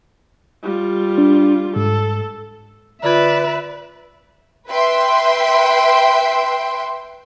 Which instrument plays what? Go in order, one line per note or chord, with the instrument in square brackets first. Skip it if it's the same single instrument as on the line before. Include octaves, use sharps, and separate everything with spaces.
[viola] G3 F4
[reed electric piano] D4
[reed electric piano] G#2 [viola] A4
[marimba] D3 F4 G#6 [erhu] B4 [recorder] D5 [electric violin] E5
[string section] B4 E5 G5 C6